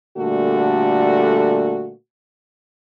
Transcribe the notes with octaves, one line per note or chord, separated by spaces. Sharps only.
A#2 D3 G3 A3 F#4